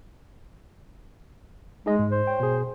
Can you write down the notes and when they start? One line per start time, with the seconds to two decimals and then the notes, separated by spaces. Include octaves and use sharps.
1.86 G#3 D#4 G#4 D#5
1.99 G#2
2.11 C5
2.27 C#5 G5
2.40 B2 G#4